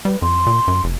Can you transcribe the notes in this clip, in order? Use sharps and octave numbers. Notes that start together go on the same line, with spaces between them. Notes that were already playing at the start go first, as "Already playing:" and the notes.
G3 B4
F2 C6
A#2
F#2
F1